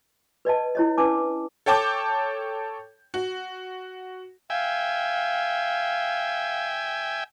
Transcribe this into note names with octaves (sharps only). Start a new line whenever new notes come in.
B4 D5 D#5 A5
E4 C#5 D#5
C#4 D4 B4 A5 D6
A4 C#5 G5 A5 D6 G6
F#4
E5 F5 G5 G#5